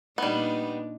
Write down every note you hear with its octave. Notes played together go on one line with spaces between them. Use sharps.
A#2 G3 B3 D4 D#4